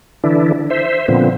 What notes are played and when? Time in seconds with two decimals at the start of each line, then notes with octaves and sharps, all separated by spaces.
0.24 D3 E3 D4 E4
0.70 C5 E5
1.08 A#2 D3 F3 B3 C4